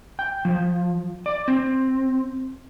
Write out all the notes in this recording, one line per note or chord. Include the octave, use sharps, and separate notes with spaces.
G5
F3
D5
C4